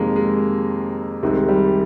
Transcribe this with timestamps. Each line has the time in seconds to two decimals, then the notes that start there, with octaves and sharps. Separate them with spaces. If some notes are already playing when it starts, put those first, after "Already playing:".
Already playing: F2 C3 D#3 G#3 A#3
0.16 G#3
1.23 C2 C3 D#3 G#3
1.49 G3